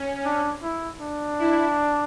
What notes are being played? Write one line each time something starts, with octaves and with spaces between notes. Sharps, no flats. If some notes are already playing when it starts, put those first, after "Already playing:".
Already playing: C#4
D4
E4
D4
E4